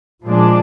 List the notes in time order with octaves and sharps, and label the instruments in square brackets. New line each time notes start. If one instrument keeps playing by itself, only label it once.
[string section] A#2 F3 G#3 D4